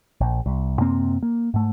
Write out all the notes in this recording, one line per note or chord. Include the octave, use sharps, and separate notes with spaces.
A#1
C2
F#2 C3 A#3 C4
A#3
G#2 A3